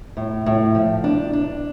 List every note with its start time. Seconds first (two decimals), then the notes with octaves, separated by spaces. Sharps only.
0.17 A2
0.46 A2
0.75 F3
1.04 D4
1.33 D4